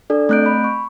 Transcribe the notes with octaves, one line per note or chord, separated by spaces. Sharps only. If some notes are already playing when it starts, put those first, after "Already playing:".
D4 A4 D5
A3 C4 F#6 G6 D7
B5
C#6